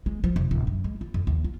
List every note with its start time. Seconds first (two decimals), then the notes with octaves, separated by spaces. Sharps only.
0.06 G#3
0.24 F3
0.36 F1
0.51 D1
0.67 F#2
0.84 G#3
1.01 F4
1.14 F2
1.27 D#2
1.44 F4